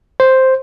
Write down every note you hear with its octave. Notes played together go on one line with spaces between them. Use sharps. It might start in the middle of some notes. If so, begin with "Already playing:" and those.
C5